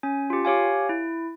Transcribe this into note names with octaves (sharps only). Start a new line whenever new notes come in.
C#4 G#5
F4 G4
G4 C#5 F5 G#5
E4